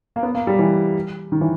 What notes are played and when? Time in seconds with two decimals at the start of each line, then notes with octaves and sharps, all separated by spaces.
0.16 A#3
0.23 B3
0.35 A#3
0.47 G3
0.59 E3
1.32 D#3
1.41 E3